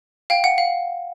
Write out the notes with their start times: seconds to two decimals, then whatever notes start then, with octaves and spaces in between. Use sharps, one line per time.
0.30 F5 G5
0.44 F#5
0.58 F5